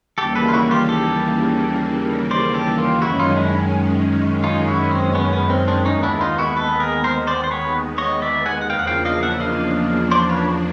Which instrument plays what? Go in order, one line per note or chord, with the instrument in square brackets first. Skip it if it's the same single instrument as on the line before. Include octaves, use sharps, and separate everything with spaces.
[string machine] D#2 C#3 E3 G3 A#3 [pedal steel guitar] G4 A4
[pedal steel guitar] A4 B4
F4
E4 F#4
F4 G4
G4 A4
C5 D5
G4 A4
F4 G4
[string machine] F#2 D#3 G#3 C#4 [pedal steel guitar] E4 F#4
[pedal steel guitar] D#4 F4
D4 E4
D#4 F4
E4 F#4
C4
B3 C#4
B3
C4
C4 D4
[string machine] D#2 D#3 G#3 B3 [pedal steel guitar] C#4 D#4
[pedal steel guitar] D4 E4
D#4 F4
E4 F#4
A4 B4
G#4 A#4
A#4 C5
C5 D5
C5
B4 C#5
C#5 D#5
D5 E5
F#5 G#5
F#5
[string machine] E2 C#3 F3 A#3 D4 [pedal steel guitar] F5 G5
[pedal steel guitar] F#5
F5 G5
D#5 F5
E5 F#5
D#5 F5
C5 D5
B4 C#5